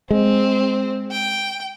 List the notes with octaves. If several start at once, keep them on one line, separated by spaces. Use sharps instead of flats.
G#3 C4
G5